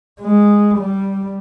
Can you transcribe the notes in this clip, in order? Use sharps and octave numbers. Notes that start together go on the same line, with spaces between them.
G#3
G3